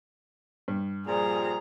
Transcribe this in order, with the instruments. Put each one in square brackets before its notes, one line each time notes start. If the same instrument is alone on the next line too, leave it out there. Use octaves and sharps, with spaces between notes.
[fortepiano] G2
[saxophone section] A#2 F3 G3 [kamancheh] G#4 A#5